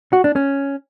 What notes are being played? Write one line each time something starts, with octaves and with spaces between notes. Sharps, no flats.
F#4
D4
C#4